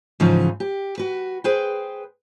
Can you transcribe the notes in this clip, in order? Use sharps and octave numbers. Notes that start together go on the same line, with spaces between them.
G#2 C#3 E3 F3 D#4
G4
F#4 B4
G#4 B4 C5 G5